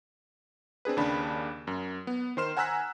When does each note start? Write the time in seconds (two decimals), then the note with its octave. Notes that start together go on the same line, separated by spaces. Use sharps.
0.85 C4 D4 G#4 B4
0.97 D#2 C#3 D4 B5
1.67 F#2
2.07 B3
2.37 D#3 C5 C6 F6 E7
2.57 F#5 G#5 A#5 E6 F#6 B6